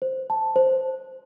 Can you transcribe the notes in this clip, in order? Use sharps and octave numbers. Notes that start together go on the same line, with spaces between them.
C5
A5
C5